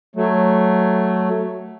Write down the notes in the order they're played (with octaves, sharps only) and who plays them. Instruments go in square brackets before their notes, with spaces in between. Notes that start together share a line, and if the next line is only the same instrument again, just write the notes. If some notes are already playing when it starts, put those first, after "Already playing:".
[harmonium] F#3 A3